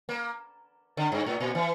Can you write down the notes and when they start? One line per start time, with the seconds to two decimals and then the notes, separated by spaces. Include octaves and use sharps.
0.09 A#3
0.97 D3
1.12 G2
1.26 A2
1.40 A#2
1.55 E3